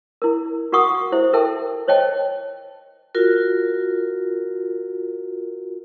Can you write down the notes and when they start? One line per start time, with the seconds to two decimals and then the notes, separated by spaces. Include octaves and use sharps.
0.22 E4 A#4
0.72 F#4 A#4 F5 F#5 C#6 D#6
1.12 E4 G4 C5 E5
1.33 A4 A#4 E5 G5 A5
1.88 C5 C#5 D#5 G5 A5
3.15 F4 F#4 A#4